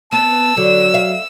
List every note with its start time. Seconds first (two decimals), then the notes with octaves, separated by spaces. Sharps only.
0.12 B3 A5 E6
0.57 D3 F#3
0.94 E5 F5